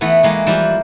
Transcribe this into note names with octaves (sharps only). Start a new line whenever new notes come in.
E3 A3 B3
E3 G#3 A#3
E3 F3 G3